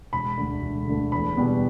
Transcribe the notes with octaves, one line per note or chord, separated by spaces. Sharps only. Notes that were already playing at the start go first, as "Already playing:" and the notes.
E1 B5
D2 D3 A3
E1
D2 D3 A3
E2 B5
B2 G3 B3